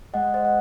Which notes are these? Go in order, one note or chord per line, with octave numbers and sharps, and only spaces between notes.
G#3 D#5 F#5
C5 D#5
F#5